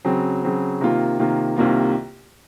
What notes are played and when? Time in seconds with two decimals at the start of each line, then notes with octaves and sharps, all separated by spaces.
0.05 C#3 F#3 C4
0.43 C#3 F#3 C4
0.81 C3 D#3 A#3 F4
1.19 C3 D#3 A#3 F4
1.57 C2 C3 D#3 A#3 F4